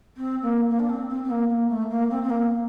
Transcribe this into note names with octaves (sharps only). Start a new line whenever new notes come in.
C4
A#3
A#3
D4
C4
C4
C4
A#3
A#3
A3
A#3
C4
C4
A#3